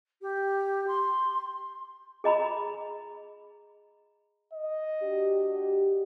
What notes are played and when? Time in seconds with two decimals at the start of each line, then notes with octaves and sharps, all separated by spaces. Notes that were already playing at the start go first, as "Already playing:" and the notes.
0.21 G4
0.87 C6
2.24 G#4 D#5 A#5 B5
4.53 D#5
5.02 D4 F#4 G4